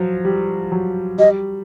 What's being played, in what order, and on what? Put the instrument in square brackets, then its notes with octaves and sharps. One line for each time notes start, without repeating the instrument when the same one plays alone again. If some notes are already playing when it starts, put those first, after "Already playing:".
Already playing: [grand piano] F3 F#3
G3
F#3
[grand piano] G3 [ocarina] D#5